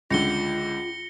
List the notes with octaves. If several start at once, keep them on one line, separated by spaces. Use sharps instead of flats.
C#2 D3 F4 A#6 C#7 G7